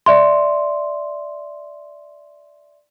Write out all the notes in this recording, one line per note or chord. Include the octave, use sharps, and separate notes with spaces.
D5 E5 C6